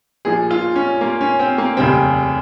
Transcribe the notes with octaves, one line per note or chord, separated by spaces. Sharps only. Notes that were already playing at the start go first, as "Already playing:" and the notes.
A#1 A#2 F3 G#4
F4
C#4
A#3
C#4
C4
A#3
F1 D#2 C#3 G3 C4